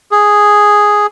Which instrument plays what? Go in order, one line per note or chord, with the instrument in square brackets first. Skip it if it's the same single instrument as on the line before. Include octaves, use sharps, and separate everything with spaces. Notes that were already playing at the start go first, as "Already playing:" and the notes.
[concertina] G#4